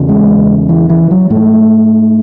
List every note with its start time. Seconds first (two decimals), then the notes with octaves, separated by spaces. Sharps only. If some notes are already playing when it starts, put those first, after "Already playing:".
Already playing: E2 C#3
0.09 G#3
0.69 E3
0.90 E3
1.11 F#3
1.30 G#2 A3